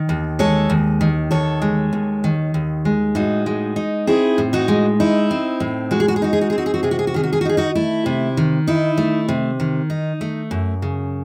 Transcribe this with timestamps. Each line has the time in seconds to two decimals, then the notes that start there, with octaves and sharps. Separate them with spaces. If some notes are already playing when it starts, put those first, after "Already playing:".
Already playing: D#3
0.09 D#2
0.39 G#3 A4 C#5
0.70 D#2
1.01 D#3
1.31 D#2 A4 C#5
1.62 G#3
1.93 D#2
2.24 D#3
2.54 D#2
2.85 G#3
3.15 A2 D#4 F#4
3.46 G#3
3.76 D#4
4.07 C4 E4 G#4
4.38 A2
4.53 D#4 F#4
4.68 G#3
5.00 D#4 E4
5.31 C4
5.60 A2
5.91 G#3 F#4
6.00 G#4
6.08 F#4
6.16 G#4
6.22 D#4 F#4
6.33 G#4
6.41 F#4
6.50 G#4
6.53 C4
6.58 F#4
6.66 G#4
6.74 F#4
6.83 C3 G#4
6.91 F#4
6.99 G#4
7.07 F#4
7.14 D#3 G#4
7.23 F#4
7.33 G#4
7.41 F#4
7.45 D#4
7.49 G#4
7.57 D#4 F#4
7.75 A3 E4
8.06 C3
8.37 D#3
8.67 D#4 E4
8.98 A3
9.28 C3
9.60 D#3
9.90 D#4
10.21 A3
10.51 F#2
10.82 C#3